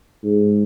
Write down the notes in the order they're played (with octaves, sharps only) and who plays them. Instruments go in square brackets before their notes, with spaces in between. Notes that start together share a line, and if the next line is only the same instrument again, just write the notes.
[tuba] G#2